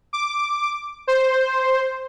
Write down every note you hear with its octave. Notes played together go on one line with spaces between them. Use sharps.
D6
C5